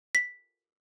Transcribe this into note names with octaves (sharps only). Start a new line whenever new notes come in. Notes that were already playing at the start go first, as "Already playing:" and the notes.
B6